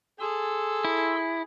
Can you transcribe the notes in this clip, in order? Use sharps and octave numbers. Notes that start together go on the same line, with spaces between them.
G#4 A4 C6 E6
E4